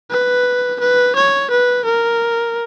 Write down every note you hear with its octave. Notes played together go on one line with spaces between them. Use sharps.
B4
B4
C#5
B4
A#4